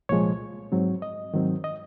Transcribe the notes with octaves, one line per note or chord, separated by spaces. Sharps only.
C2 A#2 F3 G#3 C#5
G#2 F#3 C4
D#5
G#2 D#3 F#3 C4
D#5